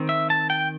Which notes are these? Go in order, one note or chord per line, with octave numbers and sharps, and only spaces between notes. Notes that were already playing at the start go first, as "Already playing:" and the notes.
Already playing: D#3 C4
E5
A5
G5